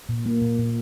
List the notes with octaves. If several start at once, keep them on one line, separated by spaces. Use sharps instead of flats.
A#2
A#3
A#2
A#2